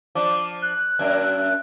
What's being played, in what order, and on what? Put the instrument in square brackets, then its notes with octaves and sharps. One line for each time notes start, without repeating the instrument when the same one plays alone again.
[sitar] F3 D4 [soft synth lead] D6
[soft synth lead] F#6
[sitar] F#2 A#3 D4